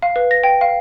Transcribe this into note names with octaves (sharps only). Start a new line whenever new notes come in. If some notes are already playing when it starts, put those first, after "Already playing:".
F5
B4
A#6
G5
F5